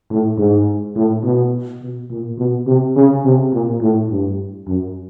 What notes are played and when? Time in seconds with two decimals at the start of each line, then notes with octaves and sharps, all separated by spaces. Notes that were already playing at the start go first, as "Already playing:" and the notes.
0.10 A2
0.38 G#2
0.96 A2
1.24 B2
1.81 B2
2.10 A#2
2.38 B2
2.66 C3
2.96 C#3
3.25 C3
3.53 A#2
3.81 A2
4.10 G2
4.67 F#2